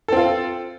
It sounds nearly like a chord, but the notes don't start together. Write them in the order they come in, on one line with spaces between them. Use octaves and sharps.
A4 C4 F4